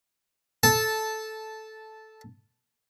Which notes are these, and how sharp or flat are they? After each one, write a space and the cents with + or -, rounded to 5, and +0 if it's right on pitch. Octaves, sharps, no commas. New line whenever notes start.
A4 -10 A5 -5